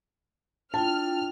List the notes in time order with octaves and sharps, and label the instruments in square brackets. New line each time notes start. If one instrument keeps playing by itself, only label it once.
[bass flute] D4 [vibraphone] E4 F4 G5 [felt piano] A5 [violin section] F6